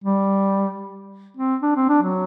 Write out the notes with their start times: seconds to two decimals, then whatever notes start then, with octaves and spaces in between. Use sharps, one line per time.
0.04 G3
1.37 C4
1.62 D4
1.76 C4
1.89 D4
2.02 F#3